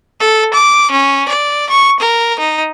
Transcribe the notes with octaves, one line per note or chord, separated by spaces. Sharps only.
A4
D6
C#4
D5
C#6
A#4
D#4